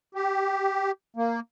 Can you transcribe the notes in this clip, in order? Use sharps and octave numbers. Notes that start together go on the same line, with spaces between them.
G4
A#3